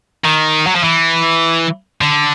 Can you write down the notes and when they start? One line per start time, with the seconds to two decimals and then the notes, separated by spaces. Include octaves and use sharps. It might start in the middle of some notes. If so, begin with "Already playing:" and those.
0.25 D#3
0.67 F#3
0.76 F3
0.84 E3
2.01 D3